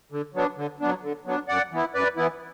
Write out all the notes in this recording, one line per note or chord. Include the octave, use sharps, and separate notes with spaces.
D3
F#3 B3 D4
D3
F#3 B3 D4
D3
F#3 B3 D4
F#2 D5 F#5
E3 B3 E4
F#2 B4 D5
E3 B3 E4